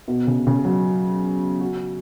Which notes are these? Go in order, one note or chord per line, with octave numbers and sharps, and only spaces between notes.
B2
C#3
C#3
F#3
F#4